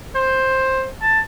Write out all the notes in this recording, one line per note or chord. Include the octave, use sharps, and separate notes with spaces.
C5
A5